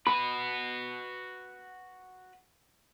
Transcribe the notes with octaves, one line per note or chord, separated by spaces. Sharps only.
F#4 B4 B5